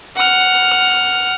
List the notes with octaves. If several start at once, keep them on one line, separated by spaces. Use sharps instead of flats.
F#5 F6